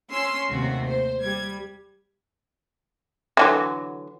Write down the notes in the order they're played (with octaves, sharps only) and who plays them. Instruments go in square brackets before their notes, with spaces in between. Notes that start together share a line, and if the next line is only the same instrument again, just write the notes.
[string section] C#4 C6 E6
D#2 C3 A3 F#4
C5
G3 G#6
[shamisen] D3 E3 F#3